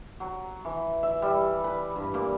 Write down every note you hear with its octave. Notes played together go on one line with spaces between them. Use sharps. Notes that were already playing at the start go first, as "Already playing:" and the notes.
F#3
E3
E5
G3
B4
G2
A#2